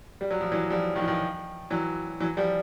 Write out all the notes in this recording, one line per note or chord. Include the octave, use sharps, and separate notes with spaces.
G3
F#3
F3
E3 F#3
F3 G3
D#3 F3
E3
D#3 F3
E3 F#3
E3 F#3
F3 G3